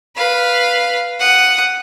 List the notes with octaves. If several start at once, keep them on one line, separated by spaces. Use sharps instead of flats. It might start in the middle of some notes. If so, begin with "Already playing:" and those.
B4 F5
F#5 D#6